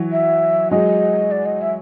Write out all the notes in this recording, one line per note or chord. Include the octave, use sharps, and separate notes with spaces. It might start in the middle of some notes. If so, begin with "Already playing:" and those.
Already playing: E3 F#3
E5
F#3 G#3 D#5
D5
D#5
E5